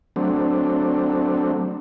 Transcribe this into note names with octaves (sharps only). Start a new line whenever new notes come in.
F#3 A3 C4 D4